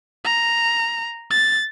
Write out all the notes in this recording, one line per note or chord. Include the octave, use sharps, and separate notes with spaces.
A#5
A6